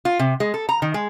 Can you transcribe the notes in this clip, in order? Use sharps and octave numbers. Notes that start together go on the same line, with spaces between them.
F4
C3
G#3
A4
A#5
D#3
G#3